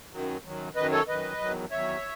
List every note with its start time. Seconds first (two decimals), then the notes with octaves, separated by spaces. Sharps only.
0.12 F#2 D#3 F#3
0.43 F#2 D#3 F#3
0.76 F#2 D#3 F#3 B4 D#5
0.91 A4 C#5
1.07 F#2 D#3 F#3 B4 D#5
1.40 E2 D#3 F#3
1.71 E2 D#3 F#3 C#5 E5